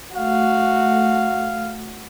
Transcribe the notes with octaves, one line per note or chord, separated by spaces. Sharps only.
A3 F#4 F5